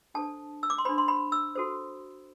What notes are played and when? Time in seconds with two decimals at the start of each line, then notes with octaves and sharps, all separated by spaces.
0.14 D4 A4 C5 A5
0.63 E6
0.70 D6
0.78 C6
0.85 D4 A4 C5 B5
0.98 C6
1.08 B5
1.32 E6
1.56 F#4 A4 C5